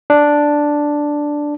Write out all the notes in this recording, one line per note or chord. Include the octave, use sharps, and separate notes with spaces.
D4